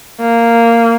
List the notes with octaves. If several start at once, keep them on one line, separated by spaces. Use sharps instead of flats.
A#3